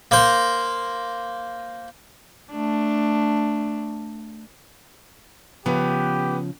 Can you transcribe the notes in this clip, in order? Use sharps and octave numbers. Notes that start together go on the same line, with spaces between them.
A#3 C5
A3 D4
C#3 F3 B3 G4 B4